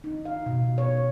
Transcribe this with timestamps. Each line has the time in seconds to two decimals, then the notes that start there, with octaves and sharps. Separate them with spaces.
0.04 D#4
0.25 F5
0.46 B2
0.78 C#5